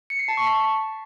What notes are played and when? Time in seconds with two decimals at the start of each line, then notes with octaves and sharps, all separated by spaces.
0.10 C#7
0.19 C7
0.28 A5
0.37 C#6
0.47 B6